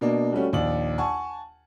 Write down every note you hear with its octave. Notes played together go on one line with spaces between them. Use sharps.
B2 A#3 D4
G3 A3 C#4 F#4
A#1 D#2 D5 F#7
F#5 G#5 A5 C#6